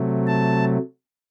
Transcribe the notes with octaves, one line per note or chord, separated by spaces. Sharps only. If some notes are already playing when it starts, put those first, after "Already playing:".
Already playing: C3 F#3 A3
A5